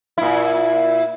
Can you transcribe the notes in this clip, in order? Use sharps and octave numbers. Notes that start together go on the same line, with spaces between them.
A#2 E4